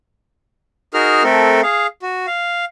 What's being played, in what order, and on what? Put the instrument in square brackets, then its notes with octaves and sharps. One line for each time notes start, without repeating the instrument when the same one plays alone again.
[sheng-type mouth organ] D#4 F#4 G#4 A#4 F6
A3 C4 A4 A#4
G#4 F5
F#4
F5